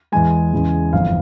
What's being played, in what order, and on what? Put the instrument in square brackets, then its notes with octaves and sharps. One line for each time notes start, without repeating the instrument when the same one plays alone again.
[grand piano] E2 E3 G#3 G#5
E2 C#3 E3 G#3
G1 F2 E3 F5